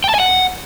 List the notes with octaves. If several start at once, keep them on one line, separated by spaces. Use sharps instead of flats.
G5
A5
G#5
F#5